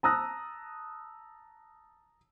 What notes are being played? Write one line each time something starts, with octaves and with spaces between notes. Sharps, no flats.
A5 A#5 D#6 E6 F#6 A#6